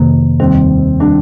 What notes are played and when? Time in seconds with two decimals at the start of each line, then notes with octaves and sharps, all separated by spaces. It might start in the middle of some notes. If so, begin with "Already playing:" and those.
Already playing: F2 C3 D#3 A#3
0.40 D#2 D#3 G3 C4
1.00 D#3 G3 D4